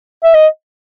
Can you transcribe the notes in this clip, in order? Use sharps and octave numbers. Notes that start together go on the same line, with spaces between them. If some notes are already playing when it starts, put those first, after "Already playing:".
E5
D#5